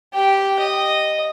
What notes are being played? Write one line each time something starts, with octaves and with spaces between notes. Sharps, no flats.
G4 G5
D#5